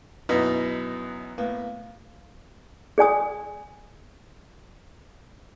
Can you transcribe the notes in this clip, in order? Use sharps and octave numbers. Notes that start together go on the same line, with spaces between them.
F#2 B2 B3 D#4 E4 A#5
A2 A#3 B3
G#4 D5 G#5 D#6